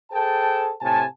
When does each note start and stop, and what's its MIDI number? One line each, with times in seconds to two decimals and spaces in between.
0.12 0.71 68
0.12 0.71 69
0.12 0.71 72
0.12 0.71 79
0.12 0.71 81
0.81 1.04 45
0.81 1.04 48
0.81 1.04 80
0.81 1.04 81